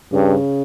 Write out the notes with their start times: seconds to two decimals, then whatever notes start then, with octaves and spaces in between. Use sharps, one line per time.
0.12 G2 C#3